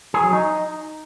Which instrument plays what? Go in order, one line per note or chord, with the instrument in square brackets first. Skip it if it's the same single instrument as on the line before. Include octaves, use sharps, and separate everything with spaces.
[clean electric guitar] G#4
F#3
D#4